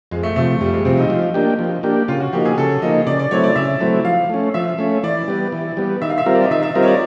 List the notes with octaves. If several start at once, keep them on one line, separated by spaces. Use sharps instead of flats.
F2 G#3
A3
C3 F3 A3
F2 G3
G#3
C3 F3 C4
D#4
F3
A#3 D4 G4
F3
A#3 D4 G4
C#3 F4
F#4
F3 A#3 D#4 G4
G#4
C#3 A4
F3 A#3 D#4 D#5
C#3 D5
D5
F#3 A3 C4 E4 C#5
D5
C#3 E5
F#3 A3 C4 E4
F3 F5
A3 C#4
F3 E5
A3 C#4
E3 D5
G3 B3
E3
G3 B3
D#3 E5
F5
E5
G3 C4 F4 A#4
D5
D#5
D#3 E5
E5
G3 C4 F4 A#4 D#5
C#5
D5